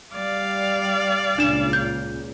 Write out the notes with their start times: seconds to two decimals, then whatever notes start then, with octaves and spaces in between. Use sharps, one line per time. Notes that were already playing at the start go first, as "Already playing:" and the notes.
0.14 G3 D5 F5
1.38 C#2 A#2 D4 E7
1.73 G6